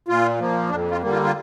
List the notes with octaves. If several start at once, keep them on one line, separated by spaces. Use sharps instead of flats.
A#2 F4
F3 A#3
F2 D4
F4
D3 G3 A#3
F4
F4